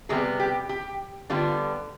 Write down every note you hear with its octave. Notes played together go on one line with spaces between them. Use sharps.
C3 G3 B3 G#4
G4
G4
D3 G3 B3 F4